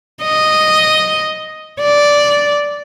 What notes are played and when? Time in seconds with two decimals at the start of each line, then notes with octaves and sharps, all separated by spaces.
0.23 D#5
1.81 D5